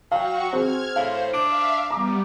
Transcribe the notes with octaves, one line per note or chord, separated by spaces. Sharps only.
F#3 F#4 F5 G5 C#6
C4 F#4 G#4 F6 G#6
A2 C5 F5
D4 E5 F5 D7
G3 B3 A#5 D6